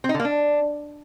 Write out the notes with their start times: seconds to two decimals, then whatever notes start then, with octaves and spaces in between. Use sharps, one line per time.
0.04 C4
0.09 D#4
0.14 D3
0.19 A#3
0.25 D4